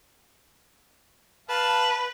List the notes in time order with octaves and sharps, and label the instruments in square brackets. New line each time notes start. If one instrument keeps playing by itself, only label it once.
[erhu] B4 [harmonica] F5 A5